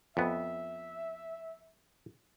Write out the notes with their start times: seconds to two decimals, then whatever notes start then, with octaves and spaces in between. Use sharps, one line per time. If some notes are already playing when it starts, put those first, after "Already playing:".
0.17 F2 B3 E5